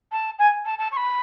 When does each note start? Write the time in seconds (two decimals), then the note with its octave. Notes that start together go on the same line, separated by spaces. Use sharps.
0.12 A5
0.39 G#5
0.65 A5
0.79 A5
0.92 C#6
0.97 B5